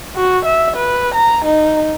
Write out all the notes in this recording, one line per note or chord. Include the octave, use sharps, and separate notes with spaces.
F#4
E5
B4
A#5
D#4